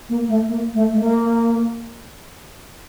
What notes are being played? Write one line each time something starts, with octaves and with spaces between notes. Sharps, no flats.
A#3
A3
A#3
A3
A3
A#3